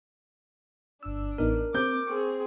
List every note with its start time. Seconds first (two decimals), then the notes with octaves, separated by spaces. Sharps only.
1.03 G1 D4 E6
1.38 A1 B3 D#4 A#4
1.74 C4 D6 G6
2.07 C4 G#4 C#6